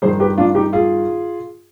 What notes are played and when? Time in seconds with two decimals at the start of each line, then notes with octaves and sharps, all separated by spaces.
0.02 G2 G#4 C5
0.05 D#3
0.20 G4 B4
0.38 D4 F4
0.55 D#4 G4
0.73 F4 G#4